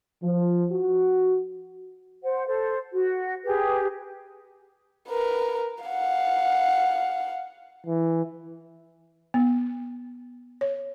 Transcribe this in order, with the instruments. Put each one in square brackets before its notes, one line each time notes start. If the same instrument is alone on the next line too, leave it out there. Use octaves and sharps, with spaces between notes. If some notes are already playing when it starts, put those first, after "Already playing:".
[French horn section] F3
F#4
[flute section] C5 F#5
A4 C5
F#4
G4 G#4 B4
[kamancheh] A#4 B4
F5 F#5
[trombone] E3
[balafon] B3
C#5